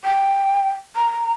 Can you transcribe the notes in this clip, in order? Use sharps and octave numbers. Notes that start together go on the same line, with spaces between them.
G5
A#5